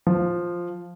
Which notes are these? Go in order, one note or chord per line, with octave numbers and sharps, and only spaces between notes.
F3